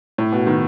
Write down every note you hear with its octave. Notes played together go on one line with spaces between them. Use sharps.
A2
B2
D#3